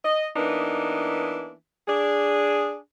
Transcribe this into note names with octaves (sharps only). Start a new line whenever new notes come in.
D#5
E3 A#3 B3 D4 D#4
D4 G#4